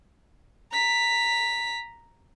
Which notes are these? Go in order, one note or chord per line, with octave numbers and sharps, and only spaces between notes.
A#5 B6